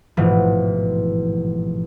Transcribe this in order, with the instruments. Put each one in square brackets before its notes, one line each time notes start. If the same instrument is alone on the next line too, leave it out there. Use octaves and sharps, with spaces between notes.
[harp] A1 G#2 B2 E3 F3